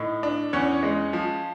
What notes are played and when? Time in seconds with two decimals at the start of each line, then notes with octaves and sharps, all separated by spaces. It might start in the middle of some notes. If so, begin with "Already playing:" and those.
Already playing: A2 D#4
0.23 D4
0.53 E2 C#4 C#5
0.83 G#3
1.13 F3